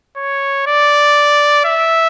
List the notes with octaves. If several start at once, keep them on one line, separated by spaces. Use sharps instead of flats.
C#5
D5
E5